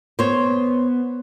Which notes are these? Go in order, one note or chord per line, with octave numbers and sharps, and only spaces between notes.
B3 C5 C#5